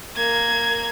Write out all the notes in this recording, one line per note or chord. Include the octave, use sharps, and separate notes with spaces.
A#3 G#6